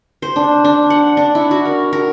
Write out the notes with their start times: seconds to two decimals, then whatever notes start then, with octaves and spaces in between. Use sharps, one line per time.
0.22 C5
0.36 D4
0.64 D4
0.90 F#5
1.17 D4
1.35 E4
1.51 F#4
1.65 A#4
1.93 A#4